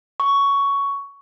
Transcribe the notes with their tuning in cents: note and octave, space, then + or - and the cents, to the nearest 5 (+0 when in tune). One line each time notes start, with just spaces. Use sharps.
C#6 +10